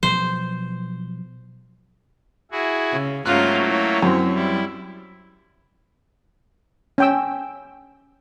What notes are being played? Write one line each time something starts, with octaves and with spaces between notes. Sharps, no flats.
B2 F3 F#3 C5
E4 F#4 G#4
C#3
G#2 F#3 A3 A#3 C#4 F4 F#6
E4 C#5
F#2 C4
G3 E4
C#4 G5 E6